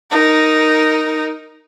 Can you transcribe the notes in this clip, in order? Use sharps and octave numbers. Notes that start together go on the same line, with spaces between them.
D#4 A#4